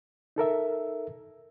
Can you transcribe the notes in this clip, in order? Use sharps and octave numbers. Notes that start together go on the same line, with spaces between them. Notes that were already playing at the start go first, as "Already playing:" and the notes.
D#4 A4 A#4 E5